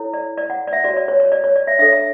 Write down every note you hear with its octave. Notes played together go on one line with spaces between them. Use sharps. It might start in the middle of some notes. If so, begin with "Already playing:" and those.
Already playing: E4 A4 C#5
D5
D5
F#5
D5
E5
F#4 C#5 D5
D5
C#5
C#5
D5
C#5
D5
E5
D4 A4 C#5 E5
E5